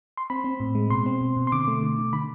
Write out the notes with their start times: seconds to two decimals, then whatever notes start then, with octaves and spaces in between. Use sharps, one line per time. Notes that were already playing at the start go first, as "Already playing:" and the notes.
0.17 C6
0.30 C4 B5
0.44 C4
0.60 A2
0.75 G#3
0.90 B2 C6
1.06 C4
1.21 B2
1.37 B2
1.47 C6
1.52 D3 D6
1.68 A3
1.83 D3
1.99 D3
2.13 D3 B5